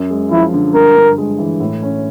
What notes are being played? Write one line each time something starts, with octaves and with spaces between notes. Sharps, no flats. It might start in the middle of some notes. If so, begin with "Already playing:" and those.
Already playing: F#2
G#3
F3 E4
D3
G2 A#4
G2
G#3
E3
A2
C#4